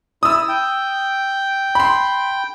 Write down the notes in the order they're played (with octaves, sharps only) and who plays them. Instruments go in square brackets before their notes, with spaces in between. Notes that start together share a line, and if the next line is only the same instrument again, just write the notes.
[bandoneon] E4 [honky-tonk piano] D#6 E6
[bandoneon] G5
[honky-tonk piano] B5 C6